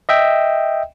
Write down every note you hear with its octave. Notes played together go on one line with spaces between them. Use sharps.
D#5 E5 G5